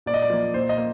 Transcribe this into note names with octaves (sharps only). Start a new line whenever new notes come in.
A#2 D5
D#5
D5
F3 A#3
A#2 C5
D#5
A#3